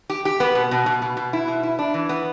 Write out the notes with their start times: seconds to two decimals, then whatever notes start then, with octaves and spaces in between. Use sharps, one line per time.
0.10 G4
0.25 G4
0.40 B3
0.55 B2
0.71 B2
0.86 B2
1.02 B2
1.17 B2
1.33 E4
1.48 B2
1.63 E4
1.79 D4
1.94 E3
2.09 B3